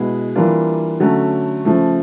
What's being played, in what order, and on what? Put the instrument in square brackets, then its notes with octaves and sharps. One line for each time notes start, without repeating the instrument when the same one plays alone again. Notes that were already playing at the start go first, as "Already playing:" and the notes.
Already playing: [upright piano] B2 G#3 B3 E4 G#4
E3 G3 A#3 D4 F4
D3 F#3 A3 C#4
C#3 F3 A3